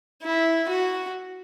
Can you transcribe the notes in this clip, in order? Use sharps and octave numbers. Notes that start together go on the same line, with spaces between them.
E4
F#4